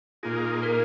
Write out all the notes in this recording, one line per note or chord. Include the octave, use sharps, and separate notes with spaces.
A#2 A#3 D#4 F4 G#4
A#4